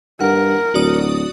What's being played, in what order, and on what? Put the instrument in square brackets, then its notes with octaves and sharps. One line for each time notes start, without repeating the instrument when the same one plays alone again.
[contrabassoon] G2 [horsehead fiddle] A#4 [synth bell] F#5
[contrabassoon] D1 [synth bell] F#4 D5 D#6